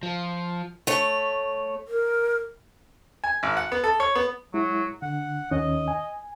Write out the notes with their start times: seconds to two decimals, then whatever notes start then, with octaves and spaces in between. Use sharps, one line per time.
0.03 F3
0.87 A3 C#5
1.88 A#4
3.24 G#5
3.43 G#1
3.57 F#5
3.72 B3
3.84 A4
4.00 C#5
4.16 B3
4.54 F#3 G#3 E4
5.02 D3 F#5
5.51 D#2 D#3 C#4 D#5
5.88 G#5